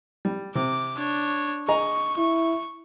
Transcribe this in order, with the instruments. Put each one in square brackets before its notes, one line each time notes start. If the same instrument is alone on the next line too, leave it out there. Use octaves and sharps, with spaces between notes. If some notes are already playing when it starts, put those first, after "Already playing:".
[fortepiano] G3
[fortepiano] C3 [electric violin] D6
[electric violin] D4 C#5
[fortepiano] G#4 D#5 A#5 [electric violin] C#6
[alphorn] E4 [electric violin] C#6